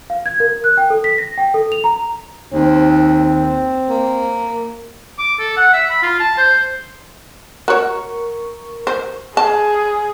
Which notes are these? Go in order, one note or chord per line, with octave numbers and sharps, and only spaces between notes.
F5
G#6
A#4
F#6
G5
A4
B6
A#6
G5
A4
F7
A#5
D#2 C4
A#3
D6
A4
F#5
E5
B5
F4
A5
C5
F#4 A#4 C#5 C#6
C5
G#4 A5